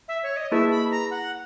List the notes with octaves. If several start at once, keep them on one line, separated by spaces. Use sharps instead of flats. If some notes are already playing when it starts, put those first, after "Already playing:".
E5
C#5
D#5
A#3 E4 G#4 B4 E5
B5
A#5
F#5